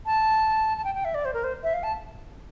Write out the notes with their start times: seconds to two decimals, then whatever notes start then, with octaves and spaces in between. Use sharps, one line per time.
0.06 A5
0.77 A5
0.84 G5
0.95 G5
1.05 E5
1.15 D5
1.25 C5
1.34 A#4
1.44 C5
1.63 E5
1.74 F5
1.83 A5